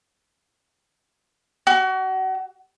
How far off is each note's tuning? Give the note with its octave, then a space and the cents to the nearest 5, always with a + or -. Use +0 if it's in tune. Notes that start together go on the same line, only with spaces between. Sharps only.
F#4 +30